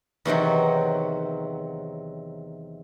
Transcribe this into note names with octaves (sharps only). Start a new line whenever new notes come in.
E2 C3 D#3 F#3